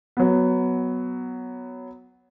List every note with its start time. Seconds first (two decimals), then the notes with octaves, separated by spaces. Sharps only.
0.17 F#3 B3